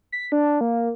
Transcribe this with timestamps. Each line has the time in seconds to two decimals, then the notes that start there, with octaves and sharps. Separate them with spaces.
0.12 B6
0.32 D4
0.61 A#3